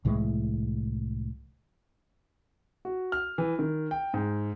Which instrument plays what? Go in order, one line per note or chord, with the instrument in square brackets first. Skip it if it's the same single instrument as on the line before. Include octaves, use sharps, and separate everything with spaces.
[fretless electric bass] C2 A2 E3 G#3
[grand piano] F#4
F6
E3
D#3
G5
G#2